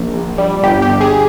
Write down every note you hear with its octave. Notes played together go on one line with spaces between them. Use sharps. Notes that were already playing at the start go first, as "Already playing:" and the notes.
Already playing: A#1
A#1
G3
G1 G4
G4
G1
G#4